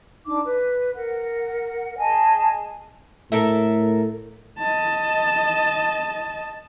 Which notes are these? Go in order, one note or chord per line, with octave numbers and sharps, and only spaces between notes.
D4 D#4 D6
B4
A#4 F#5
G#4 D#5 G#5 A5
A2 A4 A#4 E5
D#5 A5